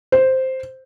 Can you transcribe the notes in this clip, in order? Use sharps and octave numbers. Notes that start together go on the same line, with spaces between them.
C5